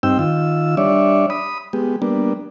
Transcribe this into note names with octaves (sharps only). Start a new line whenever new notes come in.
G2 C4 D#4 G5 E6
D#3 F4 E6
G3 D4 C#5 D5 E5
B5 D#6
G#3 B3 G4
G3 A#3 B3 D4